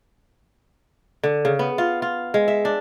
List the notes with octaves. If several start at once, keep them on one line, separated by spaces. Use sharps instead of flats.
D3
C#3
B3
F4
F4
G#3
E5
D4